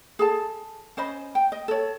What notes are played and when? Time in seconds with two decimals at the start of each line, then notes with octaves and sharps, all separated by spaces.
0.19 G#4 A4 A5
0.97 C#4 C5 D#5 B5
1.35 G5
1.52 D#5
1.68 A4 C#5